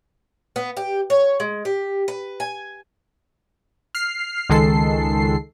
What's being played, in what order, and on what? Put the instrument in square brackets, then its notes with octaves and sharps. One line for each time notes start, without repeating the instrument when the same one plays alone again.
[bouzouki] B3
G4
C#5
G#3
G4
B4
G#5
[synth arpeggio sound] F6 C7
C#2 D#3 G#3 A4 C7